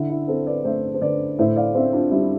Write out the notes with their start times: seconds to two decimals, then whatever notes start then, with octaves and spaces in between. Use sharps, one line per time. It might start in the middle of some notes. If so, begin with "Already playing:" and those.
Already playing: D3 E4
0.10 E4
0.28 C4 A4 C5
0.46 B4 D5
0.65 A3 C5 E5
0.94 C5
1.01 D3 B4 D5
1.39 A2 C5 E5
1.56 D5 F5
1.75 C4 C5 E5
1.93 D4 F4
2.11 G3 E4